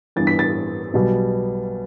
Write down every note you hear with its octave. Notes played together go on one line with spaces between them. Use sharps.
G2 E3 B3 D4 A6
B6
A6
B1 B2 G3